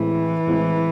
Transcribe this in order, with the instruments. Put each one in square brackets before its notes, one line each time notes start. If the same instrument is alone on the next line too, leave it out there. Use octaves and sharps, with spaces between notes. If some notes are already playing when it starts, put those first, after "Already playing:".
Already playing: [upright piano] A2 G#3 C4 [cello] E3
[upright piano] A2 G#3 C4 E4